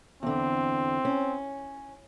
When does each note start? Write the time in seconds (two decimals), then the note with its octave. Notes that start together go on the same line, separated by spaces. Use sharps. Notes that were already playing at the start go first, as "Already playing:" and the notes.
0.23 E2 D3 C4
1.05 C#4